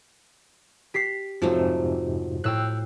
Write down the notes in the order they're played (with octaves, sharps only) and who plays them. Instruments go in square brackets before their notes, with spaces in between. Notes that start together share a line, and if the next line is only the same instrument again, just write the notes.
[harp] G4 B6 C7
[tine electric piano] F2 G#2 C3 [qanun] F3 F#3 A3
[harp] A2 [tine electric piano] G5 E6 F#6